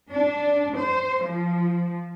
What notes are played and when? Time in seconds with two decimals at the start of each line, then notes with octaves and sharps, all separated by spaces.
0.13 D4
0.77 C5
1.25 F3